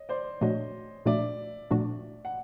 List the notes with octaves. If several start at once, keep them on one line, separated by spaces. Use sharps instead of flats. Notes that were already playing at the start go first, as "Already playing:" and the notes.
Already playing: C#5 D#5
C5 D5
A#2 F3 A3 D4 F#4 C#5 D#5
A#2 F3 A3 D4 F#4 D5 E5
A#2 F3 A3 D4 F#4
F#5